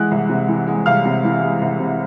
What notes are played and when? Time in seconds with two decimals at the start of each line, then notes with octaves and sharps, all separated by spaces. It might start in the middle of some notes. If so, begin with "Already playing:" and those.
Already playing: E3 G#3 F#5 F#6
0.11 C2
0.29 C3
0.48 E3
0.67 G#3
0.86 C2 F5 F6
1.05 C3
1.24 E3
1.43 G#3
1.62 C2
1.80 C3